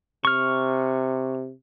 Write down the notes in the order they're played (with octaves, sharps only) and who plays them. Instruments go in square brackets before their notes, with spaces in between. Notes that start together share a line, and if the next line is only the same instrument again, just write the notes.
[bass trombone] C3 [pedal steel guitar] C#6 F6